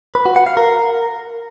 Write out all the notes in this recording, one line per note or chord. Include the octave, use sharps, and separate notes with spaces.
B4
F#4
F#5
F5
A#4